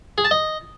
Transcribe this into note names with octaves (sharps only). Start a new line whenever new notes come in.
G#4
A5
D#5